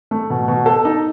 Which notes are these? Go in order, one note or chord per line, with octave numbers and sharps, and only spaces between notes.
A3
B2
B2
A4
D#4